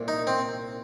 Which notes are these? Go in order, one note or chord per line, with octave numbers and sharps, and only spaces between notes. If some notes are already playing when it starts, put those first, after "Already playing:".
Already playing: C2 A#2
D#4
C4